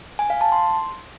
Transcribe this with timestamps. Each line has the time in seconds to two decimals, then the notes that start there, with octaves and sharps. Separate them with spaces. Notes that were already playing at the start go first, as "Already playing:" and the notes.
0.19 G#5
0.30 F5
0.41 A5
0.52 C6